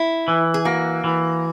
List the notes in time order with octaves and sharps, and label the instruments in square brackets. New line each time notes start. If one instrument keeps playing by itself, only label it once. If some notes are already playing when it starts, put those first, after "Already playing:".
Already playing: [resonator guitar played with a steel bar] E4
[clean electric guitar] E3
[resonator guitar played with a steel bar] G#4
[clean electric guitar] A#3 [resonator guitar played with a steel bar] F#4
[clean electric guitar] E3